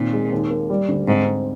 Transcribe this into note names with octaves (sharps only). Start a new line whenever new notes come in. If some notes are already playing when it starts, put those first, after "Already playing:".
Already playing: D#2 A#2 C4
G#3
D#2
A#3
G3
D2
G#2 C4
C4